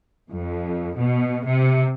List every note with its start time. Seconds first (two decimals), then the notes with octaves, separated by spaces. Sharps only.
0.32 F2
0.96 B2
1.47 C3